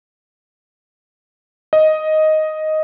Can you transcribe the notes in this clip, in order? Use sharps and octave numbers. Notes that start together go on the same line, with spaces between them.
D#5